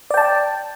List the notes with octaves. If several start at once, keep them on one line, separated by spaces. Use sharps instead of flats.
D5 G5 A5